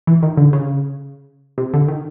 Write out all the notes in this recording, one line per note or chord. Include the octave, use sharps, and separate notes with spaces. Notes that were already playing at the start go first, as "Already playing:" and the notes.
E3
D#3
D3
C#3
C3
D3
D#3